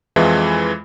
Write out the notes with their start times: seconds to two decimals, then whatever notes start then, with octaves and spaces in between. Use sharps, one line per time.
0.16 F2 E3 G#3 E4 F4